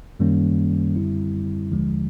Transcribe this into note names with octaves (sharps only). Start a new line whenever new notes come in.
F#2 D#3 G3 A#3 C#4
F#2 D3 G3 C4 E4
D#2 D3 F3 G#3